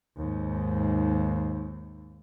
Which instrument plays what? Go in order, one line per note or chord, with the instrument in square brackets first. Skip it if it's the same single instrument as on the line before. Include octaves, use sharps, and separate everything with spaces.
[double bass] D#2 G#2